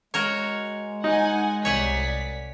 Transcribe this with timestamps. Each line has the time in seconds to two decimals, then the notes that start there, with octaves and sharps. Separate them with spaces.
0.14 G#3 F#4 A#4 C#5
1.04 D#4 F#5 G#5
1.65 C2 C#5 D5 F#5 G#5 B6